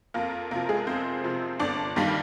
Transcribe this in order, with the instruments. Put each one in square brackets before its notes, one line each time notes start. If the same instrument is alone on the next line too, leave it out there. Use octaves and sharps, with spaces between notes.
[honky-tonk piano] F2 A#3 A#4
C3 F3 A#3 A#4
G#3 G#4
F2 C4 C5
C3 F3
G1 D4 D5
G2 D#3 G3 A#3